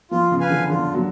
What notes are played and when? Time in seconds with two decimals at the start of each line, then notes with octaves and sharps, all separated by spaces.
0.11 F3 F4
0.31 C#3
0.40 B4 F5 G#5
0.50 D3
0.70 D3 F4
0.94 F#3